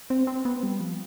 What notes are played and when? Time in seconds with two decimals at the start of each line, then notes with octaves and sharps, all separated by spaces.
0.10 C4
0.27 C4
0.45 B3
0.63 G3
0.80 F3